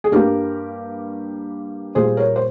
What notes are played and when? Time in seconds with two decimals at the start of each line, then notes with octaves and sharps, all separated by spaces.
0.04 G#4
0.12 G2 G3 A#3 G4 A#4
1.95 A#2 G3 A#3 G#4 C5
2.17 A#4 C#5
2.36 C5